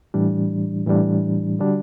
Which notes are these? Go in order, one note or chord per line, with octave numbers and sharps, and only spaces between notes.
A2 E3 G3 D4
A2 E3 G3 D4
D3 G3 D4 F#4